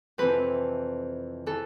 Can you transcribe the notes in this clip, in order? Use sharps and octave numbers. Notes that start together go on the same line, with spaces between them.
F2 C3 E3 B4
E3 A4